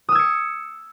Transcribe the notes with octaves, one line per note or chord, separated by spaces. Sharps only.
D#6 E6 G#6 C#7